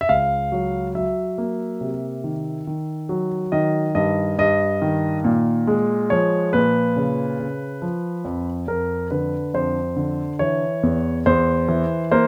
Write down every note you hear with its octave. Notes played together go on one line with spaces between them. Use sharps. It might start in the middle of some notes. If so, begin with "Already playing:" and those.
E5
C#2 F5
F#3
F#3 E5
A#3
C3
D#3
D#3
F#3
D#3 D#5
G2 D#5
G2 D#5
D#3
A#2
G#3
F3 C#5
A#2 B4
C#3
C#3
F3
F2
F2 A#4
D3 B4
F2 C5
D3
E3 C#5
E2
E2 C5
E3
A#3 C5